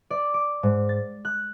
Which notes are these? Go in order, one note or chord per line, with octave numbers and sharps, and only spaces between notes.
D5
D6
G#2
A6
F#6